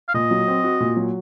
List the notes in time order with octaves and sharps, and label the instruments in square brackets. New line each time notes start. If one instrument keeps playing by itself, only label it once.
[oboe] F5
[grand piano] A#2 [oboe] D#5
[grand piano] F#3
C4
F#4
A#2
F#3